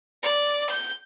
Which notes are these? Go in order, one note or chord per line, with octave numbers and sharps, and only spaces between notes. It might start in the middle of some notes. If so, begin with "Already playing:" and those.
D5
G6